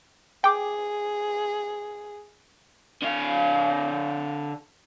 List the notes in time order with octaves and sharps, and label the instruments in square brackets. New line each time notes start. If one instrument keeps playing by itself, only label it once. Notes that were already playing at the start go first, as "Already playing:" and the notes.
[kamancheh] G#4 [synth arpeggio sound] G5 D6
[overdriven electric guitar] D3 F5